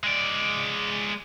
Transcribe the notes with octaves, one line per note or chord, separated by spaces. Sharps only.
G#3 D5